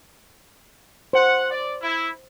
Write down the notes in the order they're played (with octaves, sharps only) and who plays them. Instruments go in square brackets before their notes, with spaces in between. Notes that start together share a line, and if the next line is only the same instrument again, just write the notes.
[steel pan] C5 [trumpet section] F#5
[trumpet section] D5
E4